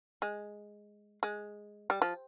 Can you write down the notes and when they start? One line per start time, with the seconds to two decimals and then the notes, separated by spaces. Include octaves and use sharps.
0.22 G#3
1.23 G#3
1.90 G3
2.02 F3